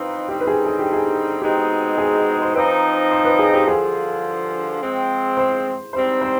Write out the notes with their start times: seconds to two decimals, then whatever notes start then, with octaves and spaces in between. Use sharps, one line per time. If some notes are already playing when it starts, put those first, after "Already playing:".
Already playing: F3 C4 D#4 B4
0.29 D3 G3 C4 D#4 G4
0.40 B4
0.47 G#4
0.66 G#4
0.79 G4
0.93 G#4
1.41 B2 G#3 C4 D#4 G4
1.98 G#4
2.42 C5
2.54 F3 C4 D#4 B4
3.11 C5
3.25 B4
3.39 G#4
3.54 G4
3.67 G2 D3 F3 G#4
4.81 F3 G#3 C4
5.37 C5
5.93 G#2 G3 C4 D#4 C5
6.21 C5